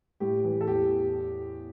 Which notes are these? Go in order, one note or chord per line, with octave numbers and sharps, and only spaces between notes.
A2 G4
E3
A4
E2 G4